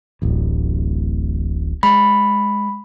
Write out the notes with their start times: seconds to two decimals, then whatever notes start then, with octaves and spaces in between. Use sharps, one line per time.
0.22 D1 A1
1.83 G#3 B5